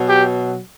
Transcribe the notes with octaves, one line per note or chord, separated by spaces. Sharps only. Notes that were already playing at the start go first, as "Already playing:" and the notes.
Already playing: B2 F#3
G4